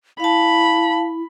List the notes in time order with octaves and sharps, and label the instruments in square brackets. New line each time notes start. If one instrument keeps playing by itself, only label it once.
[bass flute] E4 [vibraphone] F5 A5 [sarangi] B5